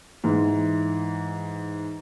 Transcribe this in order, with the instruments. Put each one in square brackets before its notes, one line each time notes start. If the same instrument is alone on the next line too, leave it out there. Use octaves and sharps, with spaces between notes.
[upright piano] G#2 E3